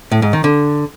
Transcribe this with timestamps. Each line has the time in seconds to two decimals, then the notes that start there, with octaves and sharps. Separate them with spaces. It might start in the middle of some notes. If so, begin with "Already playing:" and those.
0.12 A2
0.22 G#2
0.33 D#3
0.44 D3